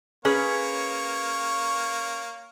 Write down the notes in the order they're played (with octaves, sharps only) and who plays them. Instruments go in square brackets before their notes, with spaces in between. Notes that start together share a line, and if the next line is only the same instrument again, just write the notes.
[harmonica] A#3 C#5 [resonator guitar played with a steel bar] C#4 G#4 B4